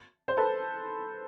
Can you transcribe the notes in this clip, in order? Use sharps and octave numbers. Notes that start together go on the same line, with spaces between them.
C5
A4 B4